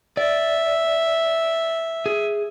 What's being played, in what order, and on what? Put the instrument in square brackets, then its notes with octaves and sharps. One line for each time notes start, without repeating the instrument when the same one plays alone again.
[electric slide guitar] D5 [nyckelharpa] E5
[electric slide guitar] G#4